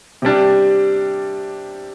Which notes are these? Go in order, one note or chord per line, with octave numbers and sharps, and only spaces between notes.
C3 G3 D4